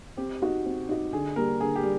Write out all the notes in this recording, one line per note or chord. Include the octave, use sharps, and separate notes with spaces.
C4 G4
D#4 F#4
C4
D#4 F#4
D3 G#4
G3 A#3 A#4
D3 G#4
G4
G3